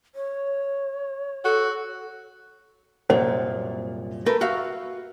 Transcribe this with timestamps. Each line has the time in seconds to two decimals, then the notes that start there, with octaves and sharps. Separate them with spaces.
0.15 C#5
1.44 F#4 A4
3.10 C2 F#2 A#2 C5
4.26 A3 A#4 B4
4.41 F#4 E5 F5